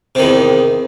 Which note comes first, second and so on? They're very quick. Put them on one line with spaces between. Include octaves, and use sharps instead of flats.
C3 D#3 E2